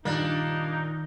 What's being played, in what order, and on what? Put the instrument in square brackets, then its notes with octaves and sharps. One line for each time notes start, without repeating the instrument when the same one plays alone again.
[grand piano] G2 A#2 G3 [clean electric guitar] D#3 [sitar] A#3 D4 [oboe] D#4